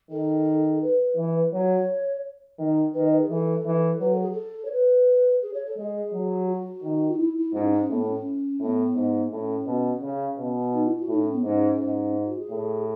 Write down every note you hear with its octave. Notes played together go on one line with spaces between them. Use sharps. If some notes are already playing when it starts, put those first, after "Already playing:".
D#3 A4
A4
B4
E3
F#3 C#5
D#3
D#3 B4
D#5
B4
G#4
E3 A4
E3
F#3 B4
A4
G#4
A4
C#5
B4
G#4
C#5
A4
G#3 G#4
F#3
F#4
D#3
D#4
E4
E4
G#2 C#4
C#4
A2 B3
C#4
C#4
A2 B3
G#2
A2 C#4
B2
C#3
B2
D#4
E4
F#4
A2 D#4
C#4
B3
G#2 C#4
G#2
F#4
G#4
A2